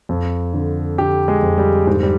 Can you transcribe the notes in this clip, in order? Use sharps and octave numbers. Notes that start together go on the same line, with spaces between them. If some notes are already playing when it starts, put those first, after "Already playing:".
F2
D3
D3 G4
G#3
F2
G3
G#2 G3
G3